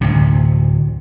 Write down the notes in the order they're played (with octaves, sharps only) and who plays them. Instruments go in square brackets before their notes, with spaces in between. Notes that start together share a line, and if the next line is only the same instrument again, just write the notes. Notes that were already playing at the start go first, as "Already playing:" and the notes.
[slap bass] D2 A2 C3